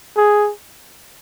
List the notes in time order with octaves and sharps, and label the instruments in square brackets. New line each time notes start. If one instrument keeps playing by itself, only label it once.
[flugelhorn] G#4